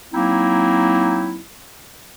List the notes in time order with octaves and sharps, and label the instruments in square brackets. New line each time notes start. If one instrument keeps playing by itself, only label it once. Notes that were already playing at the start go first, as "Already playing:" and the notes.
[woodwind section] F#3 A#3 C4 D#4 E4